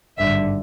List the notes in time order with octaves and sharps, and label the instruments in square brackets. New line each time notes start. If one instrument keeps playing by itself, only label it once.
[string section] G#1 G2 D3 E5